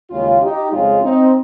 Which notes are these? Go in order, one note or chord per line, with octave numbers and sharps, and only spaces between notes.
D#2 C#3 G#3 C#4 F4
D#4 G4
F2 C#3 G#3 C#4 F4
C4 D#4